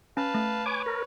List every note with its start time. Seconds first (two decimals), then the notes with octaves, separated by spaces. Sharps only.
0.17 C#4 B4 F5 A5
0.34 A3
0.66 B4 C#5 G#5 D6
0.86 A#4